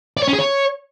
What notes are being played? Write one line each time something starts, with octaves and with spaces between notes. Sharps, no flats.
D5
C#5
C#4
G#4
C#5